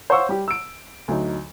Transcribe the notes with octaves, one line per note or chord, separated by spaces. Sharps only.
C5 C#5 F5 F#5 C#6 E6
G3 G4
E6 D7
D2 F#3 D#4